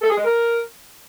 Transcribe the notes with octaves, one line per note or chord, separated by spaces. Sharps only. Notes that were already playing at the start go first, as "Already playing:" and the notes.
A4
G#4
G#3
A#4